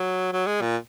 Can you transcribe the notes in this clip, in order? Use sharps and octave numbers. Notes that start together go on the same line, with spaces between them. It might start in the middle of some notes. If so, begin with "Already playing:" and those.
Already playing: F#3
F#3
G#3
A#2